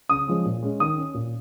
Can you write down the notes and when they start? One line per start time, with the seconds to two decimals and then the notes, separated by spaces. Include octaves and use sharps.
0.09 C#3 D#6
0.27 F3 G#3 C#4
0.45 A#2
0.63 G#3 C#4
0.80 D#3 D#6
0.98 C#4
1.14 A#2